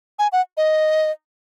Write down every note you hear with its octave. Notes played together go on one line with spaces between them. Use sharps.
G#5
F#5
D#5